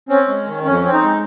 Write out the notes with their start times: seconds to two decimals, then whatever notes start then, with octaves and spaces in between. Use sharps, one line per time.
0.09 C4 C#4
0.28 G#3
0.46 D#3
0.65 F2 C#4
0.83 C4
0.93 D#4
1.02 G#3